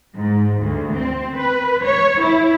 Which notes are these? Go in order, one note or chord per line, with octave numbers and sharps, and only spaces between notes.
G#2
D2
C4
B4
C#5
E4